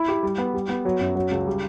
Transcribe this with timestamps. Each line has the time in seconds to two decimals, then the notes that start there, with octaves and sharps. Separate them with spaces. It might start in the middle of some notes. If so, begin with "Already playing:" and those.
Already playing: E4
0.08 G4
0.23 G3
0.38 B3
0.54 G3
0.69 B3
0.85 F#3
1.01 F#2
1.15 F#3
1.31 C#2
1.47 G3